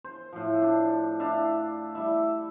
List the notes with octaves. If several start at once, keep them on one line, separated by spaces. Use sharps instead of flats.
C5
A2 F3
D4
D4 E4 E5 F5
G3 E4 E5